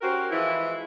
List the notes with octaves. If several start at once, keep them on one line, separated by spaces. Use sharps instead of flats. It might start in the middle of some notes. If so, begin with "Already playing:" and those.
C#4 F#4 G4 A#4 C5
E3 F3 G#3 E4